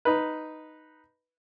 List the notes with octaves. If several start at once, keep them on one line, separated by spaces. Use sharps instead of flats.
D#4 B4